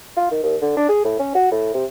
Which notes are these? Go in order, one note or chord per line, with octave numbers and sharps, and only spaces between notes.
F4
D#3
D#2
D3
D4
G#4
A2
C#4
F#4
A2
C3